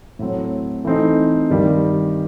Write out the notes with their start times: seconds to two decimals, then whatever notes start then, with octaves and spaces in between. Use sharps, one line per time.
0.19 A2 F#3 C4
0.85 E3 A3 C4 D#4
1.50 G2 D#3 G3